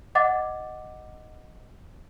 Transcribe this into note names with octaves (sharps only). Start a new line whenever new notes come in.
D#5 F#5 D6 A6